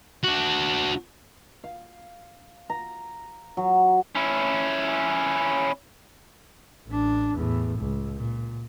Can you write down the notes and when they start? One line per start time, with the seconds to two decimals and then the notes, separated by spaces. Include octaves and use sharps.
0.24 D4 F#4
1.64 F5
2.70 A#5
3.57 F#3
4.15 C#4 E4
6.87 A1 D4
7.34 E2 A2
7.79 C#2
8.15 A#2